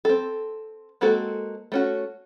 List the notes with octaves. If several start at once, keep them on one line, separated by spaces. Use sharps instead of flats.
C4 A4
G#3 A#3 C4 F#4 A4
A3 C#4 F#4